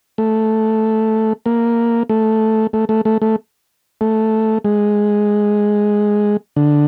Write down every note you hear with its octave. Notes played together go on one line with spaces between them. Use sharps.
A3
A#3
A3
A3
A3
A3
A3
A3
G#3
D3